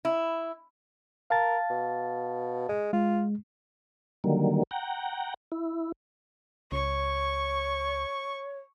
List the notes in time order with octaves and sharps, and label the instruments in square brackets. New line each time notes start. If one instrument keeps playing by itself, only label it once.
[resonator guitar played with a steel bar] E4
[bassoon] A#4 [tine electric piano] F5 A5 A6
[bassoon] B2
G#3
[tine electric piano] G#3 [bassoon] F4
[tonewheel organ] D3 D#3 F#3 G3 A#3
F#5 G5 A#5
E4
[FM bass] C#2 [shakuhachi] C#5 [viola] C#6